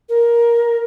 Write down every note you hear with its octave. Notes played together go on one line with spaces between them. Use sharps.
A#4